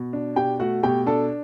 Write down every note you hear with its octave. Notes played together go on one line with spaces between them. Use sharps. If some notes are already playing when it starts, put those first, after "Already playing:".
Already playing: B2
D4
B2 G4 G5
A3 F#4 F#5
B2 G4 G5
D4 A4 A5